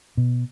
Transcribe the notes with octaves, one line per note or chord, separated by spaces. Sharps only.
B2